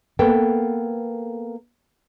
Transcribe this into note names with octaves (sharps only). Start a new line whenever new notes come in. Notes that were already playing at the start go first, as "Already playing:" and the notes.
A#3 B3 A4 G5